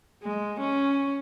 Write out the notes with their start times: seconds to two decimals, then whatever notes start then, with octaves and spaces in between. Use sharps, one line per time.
0.23 G#3
0.60 C#4